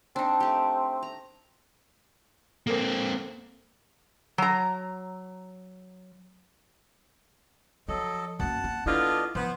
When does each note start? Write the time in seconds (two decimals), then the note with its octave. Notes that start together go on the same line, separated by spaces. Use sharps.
0.16 C4 D4 D#4
0.40 A3 G4
1.03 A#5
2.67 A#3 C4 A4 A#4 D6
4.38 F#3 A#5
7.88 F3 F#3 A4 D#5
8.40 F#2 A#3 F#5 A5
8.64 A#3
8.86 D3 B3 D4 E4 F4 D#5
9.35 F3 B3 C5